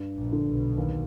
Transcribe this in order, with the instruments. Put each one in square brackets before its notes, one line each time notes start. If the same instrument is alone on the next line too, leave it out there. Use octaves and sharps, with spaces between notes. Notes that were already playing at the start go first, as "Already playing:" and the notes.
Already playing: [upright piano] G2
[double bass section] A#1 A#2
[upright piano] D3
[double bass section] B1 B2
[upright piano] D#2